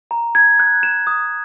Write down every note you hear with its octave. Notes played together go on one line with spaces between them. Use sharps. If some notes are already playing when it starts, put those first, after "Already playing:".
A#5
G#6
F#6
E7
D#6